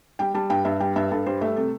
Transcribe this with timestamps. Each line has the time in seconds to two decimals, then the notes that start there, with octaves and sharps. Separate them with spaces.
0.19 G3 G5
0.34 G3 A5
0.50 G2 G5
0.65 G2 E5
0.80 G3 G5
0.96 G2 E5
1.11 G2 A4
1.26 G3 C5
1.41 A3 E5
1.56 C3 A4